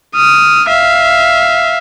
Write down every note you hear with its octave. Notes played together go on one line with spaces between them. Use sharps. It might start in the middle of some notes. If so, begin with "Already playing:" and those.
D#6 F6
E5 F5